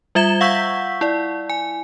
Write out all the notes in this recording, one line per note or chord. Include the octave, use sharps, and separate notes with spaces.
G3 F4 E5 G#6 E7 G7
F5 F#5 C#6 E6 G6 B6
E4 D5
G#5